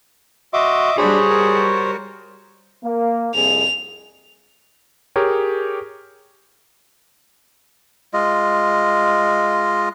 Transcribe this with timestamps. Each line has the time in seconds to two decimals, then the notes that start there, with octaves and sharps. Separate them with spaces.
0.53 F#4 D#5 E5 C6 D6
0.98 G3 D4 F#4 G#4 C5 C#5 B5
1.29 A#4
2.84 A#3
3.34 C2 F2 G#4 F7
5.16 G4 G#4 A#4 C#5
8.13 G#3 F4 D#5